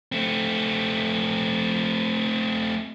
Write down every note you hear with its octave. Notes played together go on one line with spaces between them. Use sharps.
A3 C4